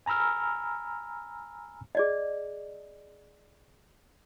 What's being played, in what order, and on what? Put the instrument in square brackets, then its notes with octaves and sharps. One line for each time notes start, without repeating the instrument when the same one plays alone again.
[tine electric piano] G#5 A#5 B5 E6 F6
[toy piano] G#4 D5 D#5